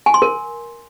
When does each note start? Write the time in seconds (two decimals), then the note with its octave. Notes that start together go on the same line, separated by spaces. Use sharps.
0.06 G#5
0.14 C6
0.22 A#4